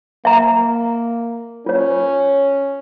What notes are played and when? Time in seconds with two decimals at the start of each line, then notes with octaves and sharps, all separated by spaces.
0.25 A#3 E5 A#5
1.66 C#4 F4 C#5